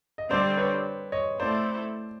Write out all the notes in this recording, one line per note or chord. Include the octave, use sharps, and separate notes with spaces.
D#5
D3 G3 C4 C5 D5
B4 C#5
C#5 D#5
A3 C4 E4 A4 C5 D5